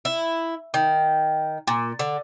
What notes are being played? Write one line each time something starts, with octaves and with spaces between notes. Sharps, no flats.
E4
D#3
A#2
D3